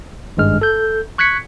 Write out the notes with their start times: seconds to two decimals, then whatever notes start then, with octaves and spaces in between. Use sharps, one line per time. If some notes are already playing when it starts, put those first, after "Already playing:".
0.37 G#1 G2 G#3 F6
0.61 A4 G6
1.18 C#6 F#6 G#6 B6 C#7